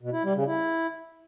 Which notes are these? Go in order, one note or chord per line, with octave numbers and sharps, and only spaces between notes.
B2
E4
G3
C#3
E4